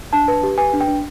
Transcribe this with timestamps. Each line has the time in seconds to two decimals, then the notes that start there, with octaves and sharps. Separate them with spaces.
0.13 D4 A5
0.28 B4
0.43 G4
0.58 B4 G#5
0.73 D4
0.81 G5
0.88 D4